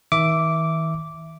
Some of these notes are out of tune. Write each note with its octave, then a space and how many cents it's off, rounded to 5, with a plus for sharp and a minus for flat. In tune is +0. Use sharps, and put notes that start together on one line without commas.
D#3 +45 E5 +0 D6 -10